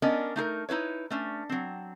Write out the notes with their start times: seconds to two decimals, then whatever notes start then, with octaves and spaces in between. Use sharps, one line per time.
0.02 B3 C#4 D4 A#4 D5 D#5
0.36 A3 D#4 G#4 A#4
0.69 D#4 E4 B4 C#5
1.10 A3 C#4 D4
1.49 F#3 C4